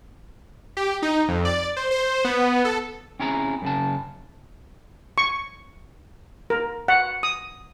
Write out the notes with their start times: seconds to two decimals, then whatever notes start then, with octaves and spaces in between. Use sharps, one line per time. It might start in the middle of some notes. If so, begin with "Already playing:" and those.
0.77 G4
1.02 D#4
1.28 F2
1.45 D5
1.77 C5
1.91 C5
2.25 B3
2.65 A4
3.19 C4 C#4 E4 G#4 A#5
3.62 F#2 C#3 A5
5.18 C#6
6.50 A#4
6.88 F#5
7.23 D#6